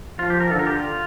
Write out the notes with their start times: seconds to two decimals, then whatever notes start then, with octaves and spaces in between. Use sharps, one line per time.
0.19 F3 F4
0.30 G4
0.40 A#4
0.51 D3 A4
0.59 A#4
0.67 G4
0.76 F4